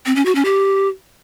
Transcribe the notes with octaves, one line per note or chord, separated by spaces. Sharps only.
C4
C#4
F#4
C#4
G4